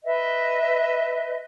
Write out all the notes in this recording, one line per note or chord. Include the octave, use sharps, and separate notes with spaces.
B4 D#5 E5